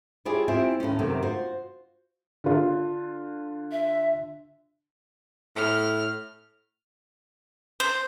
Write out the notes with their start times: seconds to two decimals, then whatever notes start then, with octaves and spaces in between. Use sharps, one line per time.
0.25 E4 F4 G4 G#4 C#5 D5
0.48 C4 E4 F4 G4 E5 G#5
0.80 D#2 A2 C3 C#4
0.99 F#2 C3 D#3 A3 A#3
1.22 F4 F#4 C5
2.44 D3 F4
3.72 E5
5.56 A2 F6
7.80 C5